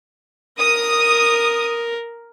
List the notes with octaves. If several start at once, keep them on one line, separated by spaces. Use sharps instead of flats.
A#4 D#6